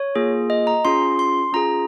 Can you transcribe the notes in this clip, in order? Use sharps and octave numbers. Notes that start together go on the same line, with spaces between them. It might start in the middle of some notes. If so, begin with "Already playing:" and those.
Already playing: C#5
A#3 F4 G#4
D#5
A#5
C#4 F4 G#4 C6
C6
C#4 F4 G#4 A#5